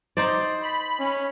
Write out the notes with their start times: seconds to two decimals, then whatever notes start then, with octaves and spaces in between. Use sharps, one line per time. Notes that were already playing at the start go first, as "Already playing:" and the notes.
0.17 D#4 C5 D5
0.63 B5
1.00 C#4